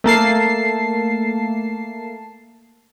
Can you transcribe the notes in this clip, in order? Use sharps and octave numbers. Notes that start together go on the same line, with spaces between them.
A3 A#3 A5 C7